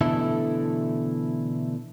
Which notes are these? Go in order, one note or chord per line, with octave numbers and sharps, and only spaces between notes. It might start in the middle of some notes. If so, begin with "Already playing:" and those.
B2 D3 E3 A3 E4 A4